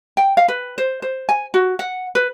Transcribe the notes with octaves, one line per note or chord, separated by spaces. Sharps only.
G5
F5
B4
C5
C5
G#5
F#4
F#5
B4